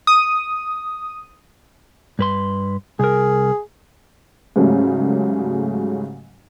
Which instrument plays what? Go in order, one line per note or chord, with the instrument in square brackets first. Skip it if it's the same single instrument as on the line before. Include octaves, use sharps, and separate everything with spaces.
[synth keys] D#6
[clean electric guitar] G2 B4 C6
[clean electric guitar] C2 A#4 [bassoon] G#4
[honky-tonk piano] G#2 C#3 F#3 G3 A3